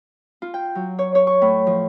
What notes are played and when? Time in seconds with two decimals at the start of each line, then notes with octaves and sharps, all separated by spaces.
0.42 F4
0.54 G5
0.75 F#3
0.99 C#5
1.15 C#5
1.27 C#6
1.42 A2
1.67 F3